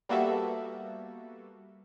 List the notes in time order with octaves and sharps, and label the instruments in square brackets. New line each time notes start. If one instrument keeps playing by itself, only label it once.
[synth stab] G3 A#3 B3 F#4 A4 E5